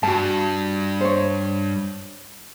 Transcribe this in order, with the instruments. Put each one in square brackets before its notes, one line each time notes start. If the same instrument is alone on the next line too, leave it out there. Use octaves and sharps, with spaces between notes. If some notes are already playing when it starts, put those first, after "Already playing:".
[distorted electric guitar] G2 [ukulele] F#4 A5
[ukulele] C5 C#5